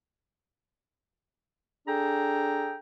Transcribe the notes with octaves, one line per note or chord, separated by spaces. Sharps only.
D4 G#4 A4 G5 A#5